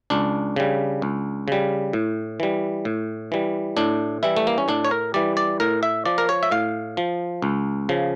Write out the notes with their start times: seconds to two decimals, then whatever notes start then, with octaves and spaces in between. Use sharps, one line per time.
0.10 C#2 D4
0.56 C#3 G3
1.02 C#2
1.48 C#3 G3
1.93 A2
2.40 E3 G3
2.85 A2
3.32 E3 G3
3.77 A2 D4
4.23 E3 G3 E4
4.37 A3
4.47 A#3
4.58 C#4
4.68 A2 D4
4.85 C#5
4.91 A#4
5.14 E3 G3 D5
5.37 D5
5.60 A2 A#4
5.83 E5
6.06 F3 D5
6.18 A#4
6.29 C#5
6.43 E5
6.51 A2 F5
6.97 F3
7.42 C#2
7.89 C#3 F3